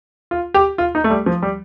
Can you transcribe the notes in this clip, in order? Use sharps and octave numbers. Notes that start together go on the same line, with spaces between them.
F4
G4
F4
D#4
A3
G3
F3
G3